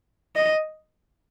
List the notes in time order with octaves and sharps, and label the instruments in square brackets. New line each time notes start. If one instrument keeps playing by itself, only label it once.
[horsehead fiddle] D#5